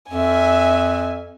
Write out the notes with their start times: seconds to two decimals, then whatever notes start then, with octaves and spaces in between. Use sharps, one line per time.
0.10 F2 E5 G#5